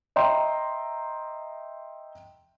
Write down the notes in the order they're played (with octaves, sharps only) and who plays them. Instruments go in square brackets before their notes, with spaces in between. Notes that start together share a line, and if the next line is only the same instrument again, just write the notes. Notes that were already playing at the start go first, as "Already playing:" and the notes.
[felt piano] D#5 E5 G5 A#5 C6